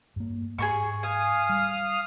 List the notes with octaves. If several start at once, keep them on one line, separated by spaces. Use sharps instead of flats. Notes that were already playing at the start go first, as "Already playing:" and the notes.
G2 A#3
G#2 G#4 A#4 C#6
F5 G#5 D#6 F6
G3